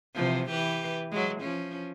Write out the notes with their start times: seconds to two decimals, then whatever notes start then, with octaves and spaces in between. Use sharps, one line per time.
0.15 C3 E3 F3
0.49 E3 G4 B4
1.11 F#3 G#3
1.41 F3 C#4